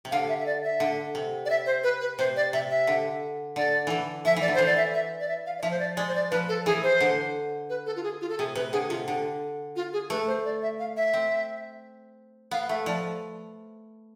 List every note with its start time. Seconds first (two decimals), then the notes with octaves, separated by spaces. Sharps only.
0.05 C3
0.11 D3 F5
0.29 E5
0.40 E5
0.46 D5
0.64 E5
0.80 D3
1.15 C3
1.45 D5
1.50 E5
1.66 C5
1.83 B4
2.01 B4
2.18 C3 C5
2.36 D5
2.53 C3 E5
2.70 E5
2.87 D3
3.56 D3 D5
3.87 D3 E3
4.25 F3 E5
4.36 E3
4.42 D5
4.48 D3
4.55 E3 C5
4.66 D5
4.77 E5
4.94 E5
5.20 D5
5.29 E5
5.46 F5
5.58 D5
5.62 F3 E5
5.71 C5
5.79 D5
5.97 G#3 D5
6.08 C5
6.15 D5
6.31 F3 B4
6.49 A4
6.66 E3 G#4
6.83 C5
7.00 D3
7.69 B4
7.86 A4
7.96 F4
8.03 G#4
8.21 F4
8.29 A4
8.38 C3 G#4
8.55 C3 B4
8.72 D3 G#4
8.89 C3 F4
9.08 D3
9.76 F4
9.93 G#4
10.10 A3 B4
10.27 C5
10.45 D5
10.62 E5
10.79 F5
10.96 E5
11.14 C4
12.51 B3 F5
12.69 A3 E5
12.86 F3 D5